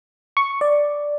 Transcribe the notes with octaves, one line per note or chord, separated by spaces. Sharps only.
C#6
D5